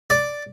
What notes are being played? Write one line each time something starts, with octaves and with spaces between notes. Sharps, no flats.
D5